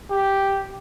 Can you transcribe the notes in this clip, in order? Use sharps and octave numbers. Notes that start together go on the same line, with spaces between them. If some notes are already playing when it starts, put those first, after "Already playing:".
G4